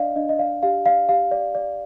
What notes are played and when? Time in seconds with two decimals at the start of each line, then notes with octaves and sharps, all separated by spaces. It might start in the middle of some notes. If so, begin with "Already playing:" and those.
Already playing: D4 D5 D#5 F5
0.16 D4 D#5
0.29 D#5
0.39 D5 F5
0.63 G4 F5
0.86 D5 F5
1.09 G4 F5
1.31 D5
1.55 D5